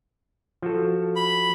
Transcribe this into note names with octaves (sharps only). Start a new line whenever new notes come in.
F3 F#4 A4
B5